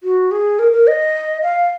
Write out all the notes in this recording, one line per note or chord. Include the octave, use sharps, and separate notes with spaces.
F#4
G#4
A#4
A#4
D#5
F5